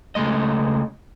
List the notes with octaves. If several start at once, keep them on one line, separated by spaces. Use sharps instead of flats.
C#2 G#3 A3 D#5